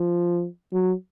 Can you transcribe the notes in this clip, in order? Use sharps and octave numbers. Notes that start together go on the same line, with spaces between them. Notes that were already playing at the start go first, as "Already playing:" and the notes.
Already playing: F3
F#3